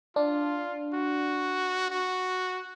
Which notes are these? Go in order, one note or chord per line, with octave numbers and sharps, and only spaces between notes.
D4 F4
F#4
F#4